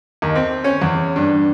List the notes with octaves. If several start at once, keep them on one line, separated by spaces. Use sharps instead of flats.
D#2
C4
C#4
E2
G2